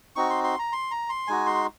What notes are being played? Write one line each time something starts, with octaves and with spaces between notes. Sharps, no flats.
C4 D#4 F#4 C#6
C6
C6
A#5
C6
A#5
C6
G#3 D#4 F#4 G#5
C6